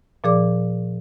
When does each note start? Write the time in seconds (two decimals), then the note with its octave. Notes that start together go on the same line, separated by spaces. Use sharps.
0.24 A#2 F3 G#4 D5 D6